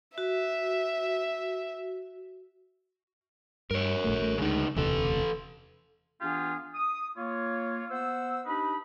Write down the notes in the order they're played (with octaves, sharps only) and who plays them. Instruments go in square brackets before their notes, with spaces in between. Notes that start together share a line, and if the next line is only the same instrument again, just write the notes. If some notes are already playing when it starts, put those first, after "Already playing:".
[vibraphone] F#4 [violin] E5
[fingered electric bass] G2 [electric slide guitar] A#4 C#5
[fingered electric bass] A#1 A2 A3
A1 A3
[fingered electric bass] D2 F#3 G#3 [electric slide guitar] C#3 D#4
[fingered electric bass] E1 D2 C3 [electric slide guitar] E3 A4
[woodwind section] E3 B3 D4 F4 G4 G#4
D#6
A#3 F4 C#5
B3 C5 F#5 E6
D4 D#4 G4 B4 D#5 B5